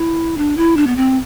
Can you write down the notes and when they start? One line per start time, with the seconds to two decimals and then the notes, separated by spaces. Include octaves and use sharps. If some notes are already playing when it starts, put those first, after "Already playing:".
Already playing: E4
0.37 D4
0.57 E4
0.77 D4
0.87 B3
0.96 C4